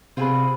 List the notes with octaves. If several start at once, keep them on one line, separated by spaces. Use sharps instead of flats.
C3 C4 F4 G#4 B4